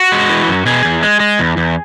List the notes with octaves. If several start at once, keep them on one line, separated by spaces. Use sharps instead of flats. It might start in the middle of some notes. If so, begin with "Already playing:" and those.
Already playing: F#4
G#3
E3
F#2
B2 G#4
E2
G#3
G#3
E2
E2